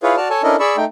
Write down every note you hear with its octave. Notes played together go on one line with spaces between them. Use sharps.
E4 F4 G#4 B4 C#5 F5
F#4 D5 A5 F6
A4 C#5 G#5 A5
C#4 D4 E4 A4 A#4 D#5
G#4 D5 B5 C#6 E6
A3 D#4 G5